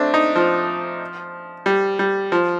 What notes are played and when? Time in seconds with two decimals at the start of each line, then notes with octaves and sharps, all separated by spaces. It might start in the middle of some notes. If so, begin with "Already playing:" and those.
Already playing: A3 C4 D4
0.14 D#4
0.36 F3
1.66 G3
1.99 G3
2.32 F3